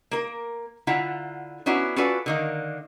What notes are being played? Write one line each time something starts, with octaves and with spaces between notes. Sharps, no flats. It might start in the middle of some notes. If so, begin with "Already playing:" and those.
A#3 A#4
D3 E4 F4 E5 F#5 A#5
B3 C#4 D4 E4 F#4 A#5
C#4 F4 F#4 A4 B4 D5
D3 D#3 A#3